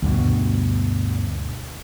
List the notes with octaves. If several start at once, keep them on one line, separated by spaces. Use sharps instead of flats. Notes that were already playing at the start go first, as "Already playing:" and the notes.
D2 G2 B2